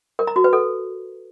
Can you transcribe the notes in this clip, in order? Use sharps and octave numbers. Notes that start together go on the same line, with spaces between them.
A#4
A#5
F#4
B4
A4